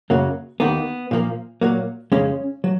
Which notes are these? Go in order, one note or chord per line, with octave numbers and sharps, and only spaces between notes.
F#2 C#3 F#3 A#3
D#2 D#3 A#3 B3
A#2 F3 A#3
A#2 F#3 A#3
F2 C#3 G#3 C#4
F#3